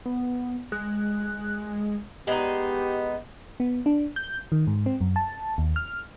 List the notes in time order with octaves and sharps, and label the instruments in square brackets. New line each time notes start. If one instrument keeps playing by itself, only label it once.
[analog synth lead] B3
[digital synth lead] G#3 [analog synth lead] F#6
[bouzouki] G#3 D#4 [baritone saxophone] B3 [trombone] G4
[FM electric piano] B3
D4
G6
D#3
G#2
C4
F#2
A5
D#2
F6